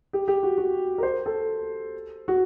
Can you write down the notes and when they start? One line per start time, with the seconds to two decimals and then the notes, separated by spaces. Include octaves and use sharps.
0.13 G4
0.28 G4
0.43 F#4
0.58 F#4
0.98 A#4
1.03 C5
1.26 A4
2.28 F#4